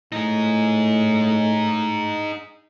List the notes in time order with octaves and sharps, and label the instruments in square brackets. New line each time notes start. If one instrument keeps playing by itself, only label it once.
[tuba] A2 [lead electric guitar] D#4 G#4